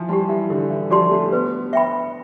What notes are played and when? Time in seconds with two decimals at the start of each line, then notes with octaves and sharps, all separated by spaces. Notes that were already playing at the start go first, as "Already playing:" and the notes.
Already playing: E3 F3
0.08 G3 G4 D5 A5 C6
0.29 E3
0.50 D3 D4
0.70 E3
0.90 F3 G4 D5 A5 C6
1.11 A3
1.32 B3 B4
1.73 E5 G5 B5